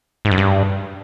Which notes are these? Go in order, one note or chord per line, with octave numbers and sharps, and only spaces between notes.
G#2
F#2
G2